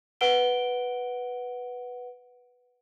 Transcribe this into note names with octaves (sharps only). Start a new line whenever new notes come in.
B4 F#5 D7 G7